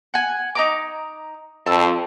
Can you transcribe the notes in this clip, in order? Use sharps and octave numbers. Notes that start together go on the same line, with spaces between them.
F#5 G#5
D#4 A#5 D6
F2 A5 E6